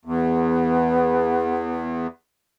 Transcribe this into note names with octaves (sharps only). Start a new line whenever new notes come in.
E2 B3